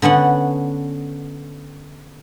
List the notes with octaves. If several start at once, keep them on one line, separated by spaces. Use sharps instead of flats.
D3 B3 C#4 F#5